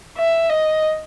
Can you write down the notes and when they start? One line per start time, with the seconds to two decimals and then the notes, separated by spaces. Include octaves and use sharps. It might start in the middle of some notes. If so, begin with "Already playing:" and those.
0.17 E5
0.50 D#5